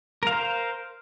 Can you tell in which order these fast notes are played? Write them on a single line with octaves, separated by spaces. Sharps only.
A#4 F5 C5